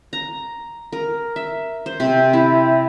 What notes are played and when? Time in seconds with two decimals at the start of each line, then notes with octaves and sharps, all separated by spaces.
0.13 A#5
0.93 A#4
1.36 E5
1.86 C5
2.00 C3
2.33 E4